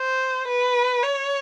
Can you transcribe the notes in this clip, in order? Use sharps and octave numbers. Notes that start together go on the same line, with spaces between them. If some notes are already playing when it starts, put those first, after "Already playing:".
Already playing: C5
B4
C#5